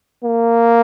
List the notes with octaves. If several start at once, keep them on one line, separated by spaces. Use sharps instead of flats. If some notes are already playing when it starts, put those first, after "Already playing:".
A#3